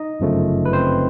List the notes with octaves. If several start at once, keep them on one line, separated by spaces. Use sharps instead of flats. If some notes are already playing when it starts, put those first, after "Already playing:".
Already playing: D#4 D#5
G1 F#2 C#3 F3 A3
B4
C4 C5